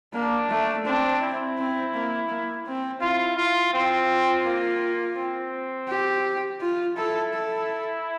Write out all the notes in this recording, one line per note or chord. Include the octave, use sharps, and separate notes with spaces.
A#3 D4
A3
C4 D4
E4
C4
A#3
A#3
C4
E4 F4
F4
C4 F4
A#3
C4
G4
F4
E4 A4
A4